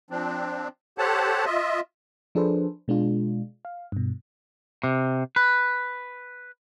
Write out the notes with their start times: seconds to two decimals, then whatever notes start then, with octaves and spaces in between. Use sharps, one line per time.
0.10 F3 C4 D4
0.98 G4 A4 C5 C#5 F#5 A5
1.45 F4 D#5 E5
2.35 F3 D4 G#4 A4 B4 C5
2.88 B2 G#3 D4 F4
3.65 F5
3.92 G2 B2
4.84 C3
5.36 B4